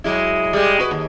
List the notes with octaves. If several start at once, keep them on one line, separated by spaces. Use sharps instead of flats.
F#3 G#3 E4
G3 G#3
F#4 B4
D#2